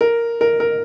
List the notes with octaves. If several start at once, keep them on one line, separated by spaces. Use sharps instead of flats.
A#4
A#4
A#4